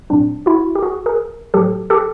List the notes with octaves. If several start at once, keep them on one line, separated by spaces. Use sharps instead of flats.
A#2 F#3 C4 D4
E4 F#4
G4
F#4 G#4
G#4 A#4
A2 F#3 G4 A4
G4 A4